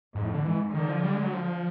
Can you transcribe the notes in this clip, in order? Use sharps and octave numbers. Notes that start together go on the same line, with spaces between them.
F2 G#2
A2
D3
G#2 E3
D3 D#3
F3
G3
G#3
F#3
F3